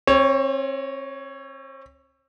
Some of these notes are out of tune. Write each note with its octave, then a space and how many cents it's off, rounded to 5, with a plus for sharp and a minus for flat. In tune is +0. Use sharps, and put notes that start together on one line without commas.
C4 +35 C#5 +0